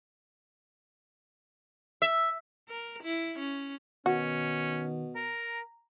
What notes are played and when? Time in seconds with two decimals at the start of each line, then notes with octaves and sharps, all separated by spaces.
2.02 E5
2.69 A#4
3.04 E4
3.39 C#4
4.06 B2 D#3 C#4 F#4
5.15 A#4 A#5